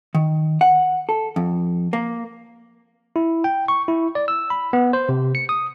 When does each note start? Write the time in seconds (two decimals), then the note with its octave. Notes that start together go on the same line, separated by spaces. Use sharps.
0.15 D#3
0.61 F#5
1.09 A4
1.36 F2
1.93 A#3
3.16 E4
3.44 G5
3.68 C#6
3.88 E4
4.15 D5
4.28 E6
4.50 B5
4.73 B3
4.93 C5
5.09 C3
5.35 C#7
5.49 D#6